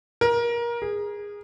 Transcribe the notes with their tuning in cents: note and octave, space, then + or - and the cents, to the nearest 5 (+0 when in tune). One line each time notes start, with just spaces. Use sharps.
A#4 +25
G#4 -15